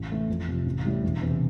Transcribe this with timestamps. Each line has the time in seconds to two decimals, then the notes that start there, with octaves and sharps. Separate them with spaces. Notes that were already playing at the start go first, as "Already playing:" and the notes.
Already playing: A1
0.10 A2 E3 A3 E4
0.28 F2
0.47 C3 F3
0.66 A1
0.85 A2 G3
1.03 E1
1.22 E2 C3